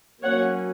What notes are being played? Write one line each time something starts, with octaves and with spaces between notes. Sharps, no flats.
F#3 A#3 C#4 C#5 F#5